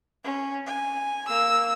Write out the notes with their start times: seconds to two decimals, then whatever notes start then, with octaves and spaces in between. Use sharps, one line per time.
0.24 C#4
0.66 G#5
1.28 A#3 E6